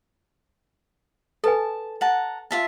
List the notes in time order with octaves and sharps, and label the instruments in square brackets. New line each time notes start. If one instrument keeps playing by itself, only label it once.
[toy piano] A4 B4 G#5 [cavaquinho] A5
[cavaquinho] F#5 A5 A#5
F4 E5 A5